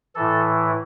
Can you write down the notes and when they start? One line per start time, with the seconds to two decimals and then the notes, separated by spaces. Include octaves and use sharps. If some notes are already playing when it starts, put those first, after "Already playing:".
0.15 A2 E3 A4